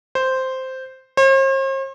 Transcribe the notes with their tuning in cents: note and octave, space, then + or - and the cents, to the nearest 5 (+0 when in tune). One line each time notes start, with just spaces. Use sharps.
C5 -5
C5 +45